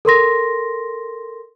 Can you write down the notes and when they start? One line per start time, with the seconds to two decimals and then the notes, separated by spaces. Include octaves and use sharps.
0.05 A4 A#4 C6 A#6